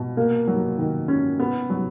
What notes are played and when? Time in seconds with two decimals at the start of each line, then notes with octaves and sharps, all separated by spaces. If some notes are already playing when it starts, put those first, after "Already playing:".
Already playing: B2
0.17 A#3
0.47 F#3
0.78 D#3
1.08 C#4
1.39 B3
1.70 F#3